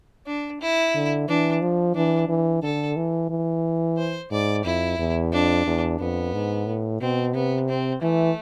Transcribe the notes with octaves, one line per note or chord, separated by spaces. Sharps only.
D4
E4
D3
E3 D4
F3
E3 D4
E3
D3 A4
E3
E3
C5
G#2 D5
F2 E4
E2
F2 D4
E2
F2 B3
G#2
A2
B2 C4
C3 B3
C4
E3 A3